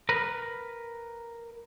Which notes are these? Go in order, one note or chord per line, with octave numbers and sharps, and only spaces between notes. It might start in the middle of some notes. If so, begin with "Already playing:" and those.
A#4 B4